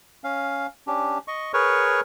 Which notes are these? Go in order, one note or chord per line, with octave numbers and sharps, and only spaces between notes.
C#4 F5
C#4 D4 G4
D#5 C#6
G#4 A#4 B4 C#5 C#6